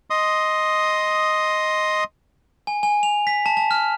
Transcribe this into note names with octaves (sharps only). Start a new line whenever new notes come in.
D#5 C6 D#6
G#5
G#5
F7
B6
A5
A5
F6